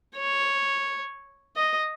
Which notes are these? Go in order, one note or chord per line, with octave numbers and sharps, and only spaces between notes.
C#5
D#5